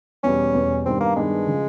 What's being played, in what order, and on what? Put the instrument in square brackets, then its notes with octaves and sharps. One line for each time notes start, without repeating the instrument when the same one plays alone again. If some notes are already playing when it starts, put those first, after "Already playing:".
[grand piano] E2 B2 G3 [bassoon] C#4
[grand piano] E2 B2 G3
[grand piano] G2 D#3 G3 B3 D4 [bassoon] C4
[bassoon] A#3
[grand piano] G2 D#3 G3 B3 D4 [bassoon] G#3
[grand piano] C#3 F3